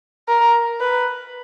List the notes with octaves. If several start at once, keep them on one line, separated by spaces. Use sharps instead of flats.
A#4
B4